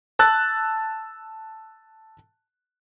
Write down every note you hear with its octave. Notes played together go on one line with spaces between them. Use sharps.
A5 E6 F#6 A6